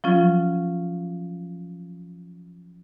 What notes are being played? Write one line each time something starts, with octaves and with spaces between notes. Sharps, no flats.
F3 F#3 C#4 F4